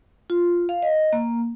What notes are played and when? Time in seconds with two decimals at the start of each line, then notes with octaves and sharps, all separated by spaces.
0.30 F4
0.69 F5
0.83 D#5
1.13 A#3